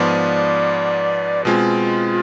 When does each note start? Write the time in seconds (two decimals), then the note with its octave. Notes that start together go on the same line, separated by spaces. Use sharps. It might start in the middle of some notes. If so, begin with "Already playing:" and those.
Already playing: G#2 F3 B3 D5
1.45 B2 G#3 C4 F4